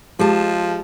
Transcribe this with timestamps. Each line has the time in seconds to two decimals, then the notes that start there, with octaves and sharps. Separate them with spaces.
0.19 F3 G#3 G4 G#4 A5